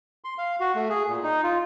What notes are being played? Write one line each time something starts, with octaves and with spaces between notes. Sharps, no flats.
C6
F5
F#4
A3
G#4
A#2
D#4
F4